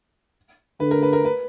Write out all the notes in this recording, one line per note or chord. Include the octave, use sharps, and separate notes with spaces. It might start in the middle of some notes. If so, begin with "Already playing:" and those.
D3 B4
A#4
B4
A#4
B4